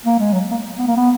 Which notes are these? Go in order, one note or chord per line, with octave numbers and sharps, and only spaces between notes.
A#3
G#3
F#3
A#3
B3
A#3
B3